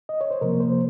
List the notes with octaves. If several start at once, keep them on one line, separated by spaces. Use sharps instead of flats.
D#5
C#5
C5
C3 F3 A#3 A#4
C5